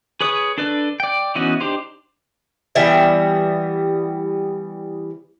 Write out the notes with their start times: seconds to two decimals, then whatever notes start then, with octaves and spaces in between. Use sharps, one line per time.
0.21 G#4 B4 C#5 D#6
0.58 D4 A4 B4 D5
1.00 D5 G5
1.35 E3 B3 C#4 D#4 F#4
1.61 D4 D#4 G4 C5
2.75 E3 G3 B3 E5